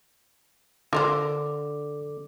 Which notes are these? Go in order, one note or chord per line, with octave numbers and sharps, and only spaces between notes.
D3 F4 A#4 C5 D6